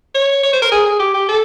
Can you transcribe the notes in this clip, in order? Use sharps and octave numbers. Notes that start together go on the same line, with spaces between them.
C#5
C#5
C5
A#4
G#4
G#4
G4
G4
A4